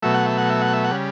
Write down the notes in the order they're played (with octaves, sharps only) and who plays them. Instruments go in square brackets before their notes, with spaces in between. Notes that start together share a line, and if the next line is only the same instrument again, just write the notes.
[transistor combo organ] B2 F#3 A3 E5
F#5
E5
F#5
E5
F#5
E5
F#5
C#3 G3